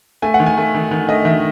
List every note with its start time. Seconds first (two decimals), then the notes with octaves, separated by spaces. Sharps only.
0.22 A3 G#5
0.34 F#5
0.40 D#3
0.46 G#5
0.57 A3
0.75 D#3
0.91 D#3
1.09 A3 D#5
1.25 D#3 E5